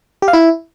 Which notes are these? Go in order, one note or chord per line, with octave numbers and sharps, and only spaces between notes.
G4
F5
E4